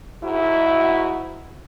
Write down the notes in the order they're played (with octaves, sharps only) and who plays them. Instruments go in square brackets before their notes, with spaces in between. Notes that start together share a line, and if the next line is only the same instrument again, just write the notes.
[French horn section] G#2 E4 F#4